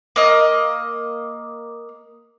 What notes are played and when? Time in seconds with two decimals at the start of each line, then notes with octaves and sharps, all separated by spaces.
0.16 A#3 D#5